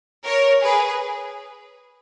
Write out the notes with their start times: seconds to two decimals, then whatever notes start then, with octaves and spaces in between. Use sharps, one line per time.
0.25 A#4 C#5
0.63 G#4 B4